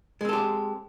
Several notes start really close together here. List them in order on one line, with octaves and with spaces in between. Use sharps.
G#3 C4 A4 G4